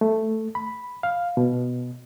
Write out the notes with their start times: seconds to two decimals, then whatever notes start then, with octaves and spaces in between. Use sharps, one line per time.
0.01 A3
0.55 B5
1.03 F5
1.37 B2